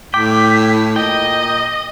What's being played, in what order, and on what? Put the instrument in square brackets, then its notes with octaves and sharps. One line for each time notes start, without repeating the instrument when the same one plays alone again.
[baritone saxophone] A2 [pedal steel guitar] G5 [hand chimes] D6 [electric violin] B6
[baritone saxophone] A#2 [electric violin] D#5 [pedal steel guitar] G5